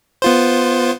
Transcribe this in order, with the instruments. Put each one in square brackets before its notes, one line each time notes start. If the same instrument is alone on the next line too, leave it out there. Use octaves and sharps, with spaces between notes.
[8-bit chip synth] B3 F4 C5